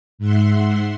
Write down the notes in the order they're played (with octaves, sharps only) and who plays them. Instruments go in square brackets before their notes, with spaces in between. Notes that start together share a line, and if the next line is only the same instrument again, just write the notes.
[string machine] G#2 E5 F#5 C6